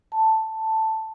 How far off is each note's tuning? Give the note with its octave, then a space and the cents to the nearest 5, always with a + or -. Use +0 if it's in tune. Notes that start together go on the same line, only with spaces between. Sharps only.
A5 +5